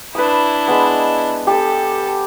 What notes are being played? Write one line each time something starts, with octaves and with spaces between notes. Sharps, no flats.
D4 E4 B4 D#6
G#3 B3
G4 A4 A5